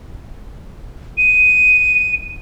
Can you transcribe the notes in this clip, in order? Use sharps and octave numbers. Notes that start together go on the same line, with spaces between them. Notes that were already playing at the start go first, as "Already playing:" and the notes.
D#7